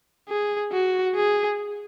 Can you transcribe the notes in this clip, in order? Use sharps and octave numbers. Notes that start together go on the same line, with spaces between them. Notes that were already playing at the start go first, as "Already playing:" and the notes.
G#4
F#4
G#4